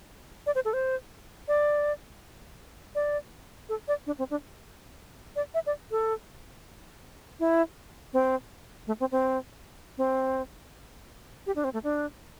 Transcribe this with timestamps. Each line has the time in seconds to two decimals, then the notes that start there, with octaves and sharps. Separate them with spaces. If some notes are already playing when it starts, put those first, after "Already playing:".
0.46 D5
0.55 C5
0.65 A4
0.73 C5
1.48 D5
2.95 D5
3.69 A4
3.88 D5
4.06 D4
4.19 C4
4.30 D4
5.36 D5
5.54 E5
5.66 D5
5.91 A4
7.40 E4
8.13 C4
8.87 A3
9.00 C4
9.12 C4
9.98 C4
11.46 G4
11.56 D4
11.64 C4
11.74 A3
11.84 D4